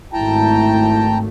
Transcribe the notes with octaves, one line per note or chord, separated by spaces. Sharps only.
G#1 A3 E4 G5 A5 A#5